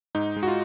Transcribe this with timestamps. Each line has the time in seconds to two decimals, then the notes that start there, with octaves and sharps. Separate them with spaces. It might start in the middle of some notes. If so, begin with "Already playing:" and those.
0.15 G#2 D#4
0.36 G#3
0.43 F#4
0.48 F4